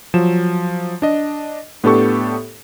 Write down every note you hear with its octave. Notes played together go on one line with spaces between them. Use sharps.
F3 F#3 E7
D4 D#5
A2 B3 D4 G4 A4 C#6